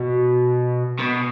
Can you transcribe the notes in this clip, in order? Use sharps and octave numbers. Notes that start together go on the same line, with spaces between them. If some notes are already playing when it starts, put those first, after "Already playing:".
Already playing: B2
B2